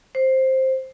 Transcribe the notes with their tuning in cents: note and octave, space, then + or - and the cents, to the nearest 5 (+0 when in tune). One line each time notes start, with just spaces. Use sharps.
C5 +10